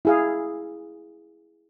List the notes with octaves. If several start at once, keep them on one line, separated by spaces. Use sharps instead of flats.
E4 G#4 F5